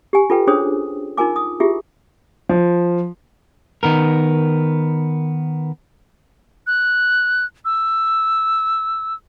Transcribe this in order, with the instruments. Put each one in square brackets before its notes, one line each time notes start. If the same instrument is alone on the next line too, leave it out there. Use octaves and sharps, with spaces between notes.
[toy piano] G4 G#5
F4 A4 B4 G5
C#4 D4 G#4 C5 C#5 D#6
D#4 F4 A#4 G#5 D6
D#6
E4 F4 G4 G#4 E5
[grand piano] F3
[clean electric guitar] D#3 B3 A#4
[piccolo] F#6
E6